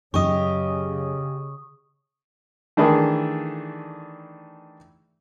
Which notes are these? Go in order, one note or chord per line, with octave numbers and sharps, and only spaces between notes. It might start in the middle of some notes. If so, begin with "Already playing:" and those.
F#2 C#3 G4 D#5 C#6 D#6
D#3 E3 A3 D4 E4 G#4